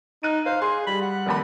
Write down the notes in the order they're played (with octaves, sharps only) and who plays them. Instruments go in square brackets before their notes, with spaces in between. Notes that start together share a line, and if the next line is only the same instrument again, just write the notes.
[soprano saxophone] D#4 [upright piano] F#6 D#7
[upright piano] C5 [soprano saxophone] F5
[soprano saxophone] G#4 [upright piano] C6
[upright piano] G3 [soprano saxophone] B5
[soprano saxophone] F#5
[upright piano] F1 D#2 B5